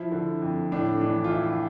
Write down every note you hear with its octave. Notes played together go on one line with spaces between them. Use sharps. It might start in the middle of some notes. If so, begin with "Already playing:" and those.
Already playing: F3 E4
D3
F2
A2 D4
E3 D4
F4
E3 E4